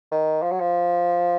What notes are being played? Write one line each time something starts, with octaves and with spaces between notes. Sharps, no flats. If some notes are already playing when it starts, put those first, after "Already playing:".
D#3
F3
F#3
F3